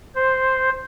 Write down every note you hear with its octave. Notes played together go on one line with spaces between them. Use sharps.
C5